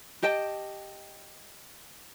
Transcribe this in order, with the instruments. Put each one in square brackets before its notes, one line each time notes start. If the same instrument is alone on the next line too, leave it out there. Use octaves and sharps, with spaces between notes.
[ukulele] G4 D#5 G5 A5